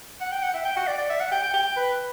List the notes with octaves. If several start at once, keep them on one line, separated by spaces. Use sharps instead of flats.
F#5
G5
F#5
E5
G5
F#5
D5
D5
E5
F#5
G5
G5
G5
B4